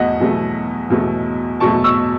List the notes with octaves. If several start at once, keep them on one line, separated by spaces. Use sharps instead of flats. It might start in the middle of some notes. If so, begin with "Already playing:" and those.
Already playing: E2 B2 F#3 A3 D#5 F#5
E2 B2 F#3 A3
E2 B2 F#3 A3
E2 B2 F#3 A3 A5 C#6
C#6 E6